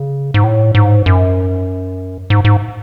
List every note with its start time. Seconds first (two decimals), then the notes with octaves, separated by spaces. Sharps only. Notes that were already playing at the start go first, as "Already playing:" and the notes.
Already playing: C#3
0.34 G#2
0.44 A2
0.75 G#2
1.06 F#2
2.30 G#2
2.45 G#2